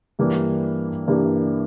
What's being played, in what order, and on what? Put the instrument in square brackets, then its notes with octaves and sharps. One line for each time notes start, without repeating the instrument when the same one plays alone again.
[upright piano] G2 E3 G3 A#3 D4
G2 E3 G3 A#3 D4